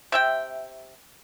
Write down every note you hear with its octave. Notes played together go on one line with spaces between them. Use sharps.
C3 E5 G5